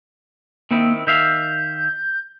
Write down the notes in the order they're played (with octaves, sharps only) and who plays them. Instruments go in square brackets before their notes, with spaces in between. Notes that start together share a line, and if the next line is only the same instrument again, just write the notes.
[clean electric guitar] D#3 C4 E4 [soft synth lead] A#3
[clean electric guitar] D#3 E5 F5 [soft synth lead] G6